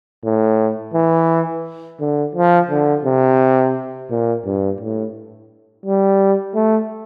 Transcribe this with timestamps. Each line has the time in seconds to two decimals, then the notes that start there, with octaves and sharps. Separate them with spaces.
0.25 A2
0.94 E3
2.00 D3
2.35 F3
2.70 D3
3.05 C3
4.11 A#2
4.46 G2
4.81 A2
5.86 G3
6.55 A3